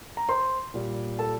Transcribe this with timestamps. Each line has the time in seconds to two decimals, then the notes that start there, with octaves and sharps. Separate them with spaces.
0.17 A#5
0.29 C5 C6
0.74 A#2 G3
1.19 A4 A5